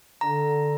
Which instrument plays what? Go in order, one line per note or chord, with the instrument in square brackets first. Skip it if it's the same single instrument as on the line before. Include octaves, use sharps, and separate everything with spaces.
[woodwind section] D3 [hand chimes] A#5